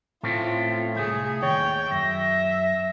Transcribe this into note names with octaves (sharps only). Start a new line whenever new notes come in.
A2 A3 C4 C#4 F4
C2 G#2 A3 G#4
D#2 C#5 G5
F#2 E5 A#6